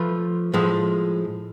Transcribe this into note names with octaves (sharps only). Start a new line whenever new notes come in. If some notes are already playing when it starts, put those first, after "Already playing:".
Already playing: F3 A3 F4 B4
A2 F3 G#3